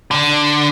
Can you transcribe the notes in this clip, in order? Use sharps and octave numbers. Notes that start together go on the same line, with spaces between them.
D3